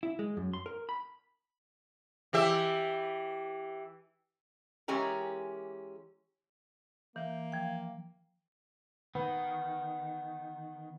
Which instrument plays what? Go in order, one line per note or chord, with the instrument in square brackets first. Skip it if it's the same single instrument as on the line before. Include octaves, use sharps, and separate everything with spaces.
[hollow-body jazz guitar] E4
G#3
F#2
C6
A#4
B5
[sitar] E3 G4 E5
[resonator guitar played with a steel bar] E3 G#3 C#4 G4 A#4
[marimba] E3 [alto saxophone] A#3
[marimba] F3 G5
[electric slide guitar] D#3 [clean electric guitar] B3